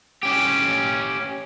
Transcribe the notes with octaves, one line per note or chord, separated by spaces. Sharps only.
C#4 G4